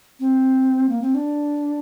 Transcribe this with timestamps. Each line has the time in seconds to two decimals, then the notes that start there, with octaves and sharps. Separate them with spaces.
0.20 C4
0.89 A#3
1.02 C4
1.15 D4